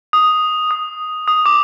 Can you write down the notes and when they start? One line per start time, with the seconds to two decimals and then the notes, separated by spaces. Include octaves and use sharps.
0.13 D#6
0.71 D#6
1.28 D#6
1.46 D6